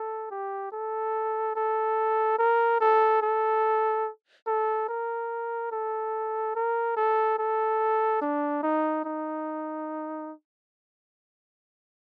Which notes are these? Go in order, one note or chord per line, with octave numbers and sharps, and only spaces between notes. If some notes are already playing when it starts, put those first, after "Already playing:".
Already playing: A4
G4
A4
A4
A#4
A4
A4
A4
A#4
A4
A#4
A4
A4
D4
D#4
D#4